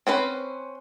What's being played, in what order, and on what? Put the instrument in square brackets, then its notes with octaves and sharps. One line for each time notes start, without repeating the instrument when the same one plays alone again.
[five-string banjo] C4 C#4 B4 C5